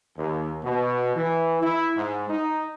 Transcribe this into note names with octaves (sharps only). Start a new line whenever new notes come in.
D#2
B2
E3
E4
G#2
D#4